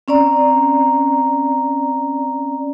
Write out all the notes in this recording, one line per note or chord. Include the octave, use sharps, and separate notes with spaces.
C4 C#4 D5 A#5